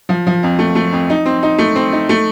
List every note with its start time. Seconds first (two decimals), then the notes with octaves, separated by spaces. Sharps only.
0.09 F3
0.27 F3
0.43 F2
0.59 A3
0.75 A3
0.92 F2
1.10 D#4
1.26 C4
1.43 D#4
1.58 A3
1.76 C4
1.92 D#4
2.09 A3